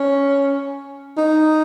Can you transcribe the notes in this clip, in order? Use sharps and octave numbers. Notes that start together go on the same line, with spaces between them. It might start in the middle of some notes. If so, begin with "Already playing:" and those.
Already playing: C#4
D#4